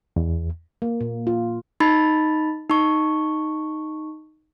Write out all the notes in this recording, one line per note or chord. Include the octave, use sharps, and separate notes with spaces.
E2
A#3
A#2
F4
D#4 B5 A6
D#4 C#6